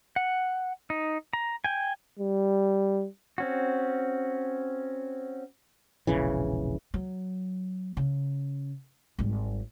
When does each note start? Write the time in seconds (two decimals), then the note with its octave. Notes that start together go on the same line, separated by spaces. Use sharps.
0.16 F#5
0.90 D#4
1.33 A#5
1.64 G5 G#5
2.19 G3
3.38 C4 C#4 F#4
6.07 E1 A#1 C#3 E3
6.94 F#3
7.97 C#3
9.19 G#1 G3